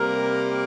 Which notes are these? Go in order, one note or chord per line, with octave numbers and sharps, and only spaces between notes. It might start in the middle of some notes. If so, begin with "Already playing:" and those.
Already playing: C3 G3 A#3 A#4